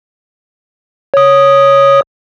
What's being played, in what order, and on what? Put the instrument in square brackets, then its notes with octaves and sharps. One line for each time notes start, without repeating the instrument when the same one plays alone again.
[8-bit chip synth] C#5 D#6